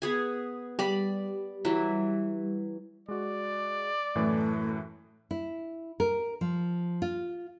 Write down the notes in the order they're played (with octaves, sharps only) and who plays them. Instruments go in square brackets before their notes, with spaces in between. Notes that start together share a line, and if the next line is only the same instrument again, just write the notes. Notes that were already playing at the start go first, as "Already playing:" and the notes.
[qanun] B3 G#4 G#5
[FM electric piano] G3 [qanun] D5 B5
[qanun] E3 F#3 E4
[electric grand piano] G#3 F#4 [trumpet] D5
[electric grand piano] F#2 A2 E3 [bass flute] A3
[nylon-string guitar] E4
A#4
F3
F4